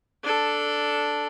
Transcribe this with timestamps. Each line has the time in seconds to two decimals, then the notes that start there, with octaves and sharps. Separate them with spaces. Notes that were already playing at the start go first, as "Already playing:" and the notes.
0.23 D4 A4